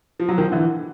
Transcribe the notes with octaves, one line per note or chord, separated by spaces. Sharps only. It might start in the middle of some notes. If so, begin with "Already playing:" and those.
F3
F#3
D#3 F3
D3 E3